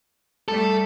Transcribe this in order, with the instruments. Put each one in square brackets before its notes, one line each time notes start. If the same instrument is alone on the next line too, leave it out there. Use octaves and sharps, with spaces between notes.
[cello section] G3 A3 [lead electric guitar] A4